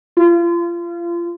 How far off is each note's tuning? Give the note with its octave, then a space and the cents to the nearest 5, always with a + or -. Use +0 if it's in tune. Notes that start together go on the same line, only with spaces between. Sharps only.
F4 -35